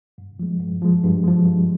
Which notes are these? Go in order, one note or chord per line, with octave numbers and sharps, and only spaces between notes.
G2
F3 G#3
G2
F3 G#3
G2
F3 G#3
G2